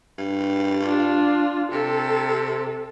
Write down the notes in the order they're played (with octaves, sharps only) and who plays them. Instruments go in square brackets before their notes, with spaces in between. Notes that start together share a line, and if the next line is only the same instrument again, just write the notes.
[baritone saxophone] G2
[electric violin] D4 F4
[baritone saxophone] C3 [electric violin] A4